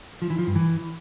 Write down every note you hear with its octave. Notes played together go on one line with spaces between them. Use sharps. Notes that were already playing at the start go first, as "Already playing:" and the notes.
F3
E3
F3
G2
E3